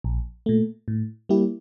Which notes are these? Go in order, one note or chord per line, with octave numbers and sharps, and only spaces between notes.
A#1
A#2 A3
A2
G3 A#3 E4 G4